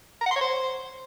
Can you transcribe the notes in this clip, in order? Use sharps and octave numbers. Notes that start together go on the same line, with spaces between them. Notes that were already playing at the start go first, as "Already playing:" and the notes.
A#5
F#5
C6
C#5
C5